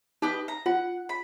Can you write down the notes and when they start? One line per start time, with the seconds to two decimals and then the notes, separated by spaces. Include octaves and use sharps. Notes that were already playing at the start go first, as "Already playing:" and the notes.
0.22 D#4 G4 B4 D#5
0.48 A#5
0.66 F4 F#5
1.09 B5